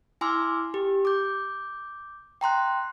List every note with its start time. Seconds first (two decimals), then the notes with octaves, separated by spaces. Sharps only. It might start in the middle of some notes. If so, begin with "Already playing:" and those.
0.21 E4 G#5 C6 D6 E6 F6
0.74 G4
1.05 D6 G6
2.41 G5 A#5 C6 F#6